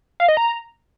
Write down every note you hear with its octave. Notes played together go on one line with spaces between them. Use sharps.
F5
D#5
A#5